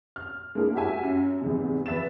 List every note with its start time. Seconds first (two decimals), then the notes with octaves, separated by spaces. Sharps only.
0.16 F6
0.55 G#3 A#3 D4 E4 G#4
0.75 F#4 G4 E5 G#5
1.03 F#2
1.42 E2 G#2 C3
1.86 E2 B4 E5 A6 E7